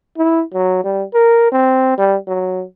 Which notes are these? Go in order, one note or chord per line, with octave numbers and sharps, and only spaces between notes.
E4
F#3
G3
A#4
C4
G3
F#3